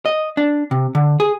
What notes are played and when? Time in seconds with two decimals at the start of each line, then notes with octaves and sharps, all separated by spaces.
0.06 D#5
0.37 D4
0.71 C3
0.95 D3
1.20 G#4